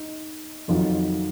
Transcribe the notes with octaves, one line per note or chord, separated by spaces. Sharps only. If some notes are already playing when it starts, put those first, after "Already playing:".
Already playing: D#4
F2 D#3 F#3 F4